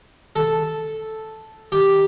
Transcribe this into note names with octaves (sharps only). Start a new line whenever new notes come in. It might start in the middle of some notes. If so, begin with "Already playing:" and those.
A4
G4